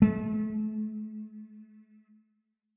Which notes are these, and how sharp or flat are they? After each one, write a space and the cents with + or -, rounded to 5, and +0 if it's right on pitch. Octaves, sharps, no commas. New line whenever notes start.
A3 -35